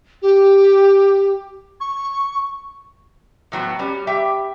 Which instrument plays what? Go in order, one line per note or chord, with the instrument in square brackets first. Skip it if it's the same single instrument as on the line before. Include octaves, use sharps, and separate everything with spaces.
[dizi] G4
C#6
[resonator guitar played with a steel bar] A2 F#3 B3 F#4
G3 C#4
G4 E5 G5